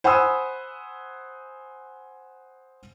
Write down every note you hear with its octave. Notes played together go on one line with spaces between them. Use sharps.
C5 F#5 G#5 B5 D#6 E6